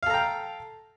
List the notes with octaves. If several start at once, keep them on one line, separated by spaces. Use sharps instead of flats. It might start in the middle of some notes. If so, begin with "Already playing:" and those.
A4 F5 G5 A#5